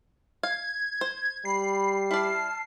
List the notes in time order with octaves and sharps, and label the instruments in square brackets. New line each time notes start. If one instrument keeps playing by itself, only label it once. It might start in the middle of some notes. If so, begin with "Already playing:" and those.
[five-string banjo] F5 [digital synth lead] G#6
[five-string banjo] C5
[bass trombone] G3 [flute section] B5 [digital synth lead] C7
[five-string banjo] E4 D5 [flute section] A5 F6